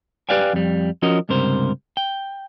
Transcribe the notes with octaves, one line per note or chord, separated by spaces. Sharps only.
G4 B4 D5 F5 G5 G#5
F2 G3
F3 C#4 F#4 A#4 D#5
C#2 G2 C3 A#4 C5
G5